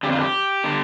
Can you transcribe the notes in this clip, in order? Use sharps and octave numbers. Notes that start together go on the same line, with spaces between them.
F2 D3 G4
F4
G4
D3